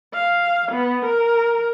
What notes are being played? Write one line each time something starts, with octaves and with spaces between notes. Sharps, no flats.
F5
B3
A#4